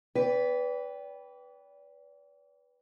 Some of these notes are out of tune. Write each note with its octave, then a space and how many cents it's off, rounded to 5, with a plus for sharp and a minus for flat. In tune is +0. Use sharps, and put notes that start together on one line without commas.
B4 +0 D5 -40 G5 +0